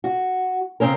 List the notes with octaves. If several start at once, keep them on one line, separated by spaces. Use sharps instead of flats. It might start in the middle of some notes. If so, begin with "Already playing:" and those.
F#4
C#3 C4 C#4 A#4